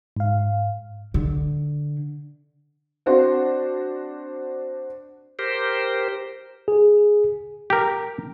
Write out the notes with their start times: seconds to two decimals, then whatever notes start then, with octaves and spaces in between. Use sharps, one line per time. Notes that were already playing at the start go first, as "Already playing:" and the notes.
0.16 G#2 F5
1.14 D3
3.06 C4 D4 F#4 C5
5.39 G4 A#4 C5
6.68 G#4
7.70 G4 A#4